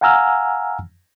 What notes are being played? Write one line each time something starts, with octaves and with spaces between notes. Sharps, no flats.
F5 F#5 G#5 A#5 E6 F6